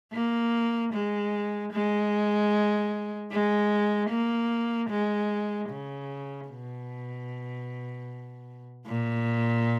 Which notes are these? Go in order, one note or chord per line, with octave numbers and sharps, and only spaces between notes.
A#3
G#3
G#3
G#3
A#3
G#3
C#3
B2
A#2